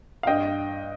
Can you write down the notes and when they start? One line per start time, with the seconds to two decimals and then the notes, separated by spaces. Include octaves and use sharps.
0.23 F5
0.27 G2 D#5 G5